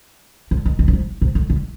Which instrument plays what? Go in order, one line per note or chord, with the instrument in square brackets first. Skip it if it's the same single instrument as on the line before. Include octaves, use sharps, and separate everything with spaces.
[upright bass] D3
D#3
D#3
D3
C3
C3
D3
D3